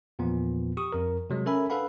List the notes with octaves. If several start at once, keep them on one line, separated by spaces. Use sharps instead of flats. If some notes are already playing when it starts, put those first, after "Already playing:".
E2 A#2 F3 B3
G4 C#6 D#6
F2 A#4
C3 F#3 G#3
C#4 A4 A#4 E5 G#5 B5
D4 A4 B4 F5 F#5 B5